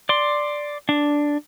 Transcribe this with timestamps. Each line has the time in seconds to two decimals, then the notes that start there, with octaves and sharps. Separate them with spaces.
0.09 D5 C6
0.89 D4